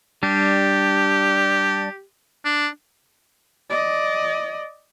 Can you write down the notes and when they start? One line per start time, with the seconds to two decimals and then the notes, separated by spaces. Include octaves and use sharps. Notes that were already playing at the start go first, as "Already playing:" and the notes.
0.23 G3 D4 G4
2.45 D4
3.70 D5 D#5